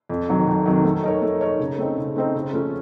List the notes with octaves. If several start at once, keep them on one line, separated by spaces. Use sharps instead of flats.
F2
C3 D#3 F#3
F2
C3 D#3 F#3
A3
D#4 A#4 C#5
A3
D#4 A#4 C#5
C#3
A3 C4 D#4
C#3
A3 C4 D#4
C#3
F3 A3 C#4